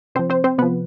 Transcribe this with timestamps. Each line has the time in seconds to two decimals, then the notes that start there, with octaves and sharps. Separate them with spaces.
0.15 C3 F3 C4 C5
0.30 C4 C5
0.44 C4 C5
0.58 C3 F3 B3 B4